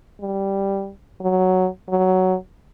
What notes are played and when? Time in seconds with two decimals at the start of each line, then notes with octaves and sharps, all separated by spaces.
0.20 G3
1.21 F#3
1.88 F#3